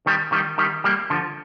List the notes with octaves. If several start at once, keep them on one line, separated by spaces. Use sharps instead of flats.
D#3 G3
D#3 G3
D#3 G3
G3 A#3
D3 F3